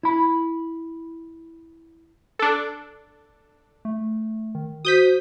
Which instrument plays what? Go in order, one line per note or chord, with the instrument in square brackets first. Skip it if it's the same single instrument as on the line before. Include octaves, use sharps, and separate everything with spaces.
[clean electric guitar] E4 B5
[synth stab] D4 A4
[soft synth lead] A3
D#3
[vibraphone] F#4 C5 [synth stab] D#6 G6 B6